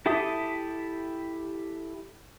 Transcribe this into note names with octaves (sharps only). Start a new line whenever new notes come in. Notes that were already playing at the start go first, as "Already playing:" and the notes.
E4 G4 A4 E5 D#6